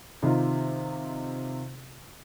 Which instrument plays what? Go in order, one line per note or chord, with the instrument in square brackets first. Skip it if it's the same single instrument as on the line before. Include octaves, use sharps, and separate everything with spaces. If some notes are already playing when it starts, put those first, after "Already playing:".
[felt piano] C3 D#3 D#4 F4